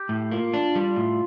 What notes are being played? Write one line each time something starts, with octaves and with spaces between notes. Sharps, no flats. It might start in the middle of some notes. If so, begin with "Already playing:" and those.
Already playing: G4
A2
A#3 F4
D4
G3
A2